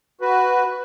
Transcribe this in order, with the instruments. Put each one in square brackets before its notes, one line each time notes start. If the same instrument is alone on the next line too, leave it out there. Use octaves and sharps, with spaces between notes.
[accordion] F#4 B4